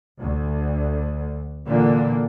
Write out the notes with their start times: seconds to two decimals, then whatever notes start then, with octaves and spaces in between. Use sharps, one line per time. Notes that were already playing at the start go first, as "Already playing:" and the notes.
0.20 D2
1.67 A#2 D3 E3 A#3